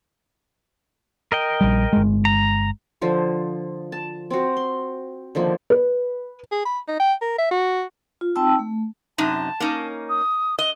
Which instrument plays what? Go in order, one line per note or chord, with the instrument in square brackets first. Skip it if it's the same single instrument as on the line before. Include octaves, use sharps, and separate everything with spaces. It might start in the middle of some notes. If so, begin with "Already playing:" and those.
[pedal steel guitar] A#4 D#5 G5
[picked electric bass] A#1 G3
G1 G#3
[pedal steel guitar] A#5
[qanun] D3 F3 C5
A5
C4 F#4
C6
D3 D#3 F3 A#3
[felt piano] B4
[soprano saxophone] G#4
B5
D#4
G5
A#4
E5
F#4
[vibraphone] F4
C4 D#4 G5 A5 E6
A3
[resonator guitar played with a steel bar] F#2 C3 D#4 [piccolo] A5
[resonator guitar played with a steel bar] A#3 C#4 D#4
[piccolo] D#6
[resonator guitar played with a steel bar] D#5 [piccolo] G7